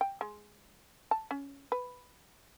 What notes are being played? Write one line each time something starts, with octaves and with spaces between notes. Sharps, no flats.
G5
G#3
A5
C#4
B4